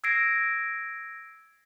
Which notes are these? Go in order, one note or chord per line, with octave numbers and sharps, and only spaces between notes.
E6 G#6 A#6 C7 D7